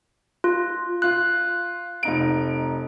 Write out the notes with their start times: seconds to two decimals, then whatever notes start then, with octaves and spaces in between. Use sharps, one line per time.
0.44 F4
1.02 F4 C6 F#6
2.03 F1 D#4 D7